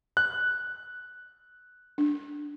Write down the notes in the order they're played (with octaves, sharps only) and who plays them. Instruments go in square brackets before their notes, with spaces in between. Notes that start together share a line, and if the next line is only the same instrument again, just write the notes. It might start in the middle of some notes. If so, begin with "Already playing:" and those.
[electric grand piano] F#6
[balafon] D4